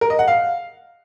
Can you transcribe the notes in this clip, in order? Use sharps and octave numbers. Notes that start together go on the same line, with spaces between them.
A#4
D#5
F#5
F5